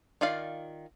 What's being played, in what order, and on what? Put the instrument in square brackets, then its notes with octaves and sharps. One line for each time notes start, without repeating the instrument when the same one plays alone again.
[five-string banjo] D#3 F4 D5 F5